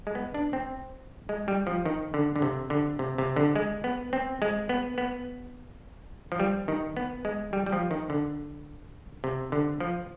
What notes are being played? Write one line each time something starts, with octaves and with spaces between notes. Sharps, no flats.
G#3
B3
D4
C4
G#3
G3
F3
D#3
D3
D3
C3
D3
C3
C3
D3
G#3
B3
C4
G#3
B3
B3
F3
G3
D#3
B3
G#3
G3
G3
F3
D#3
D3
C3
D3
F3